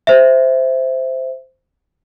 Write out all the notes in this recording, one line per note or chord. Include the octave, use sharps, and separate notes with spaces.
C5 E5